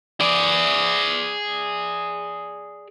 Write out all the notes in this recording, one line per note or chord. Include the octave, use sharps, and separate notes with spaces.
G#4 D5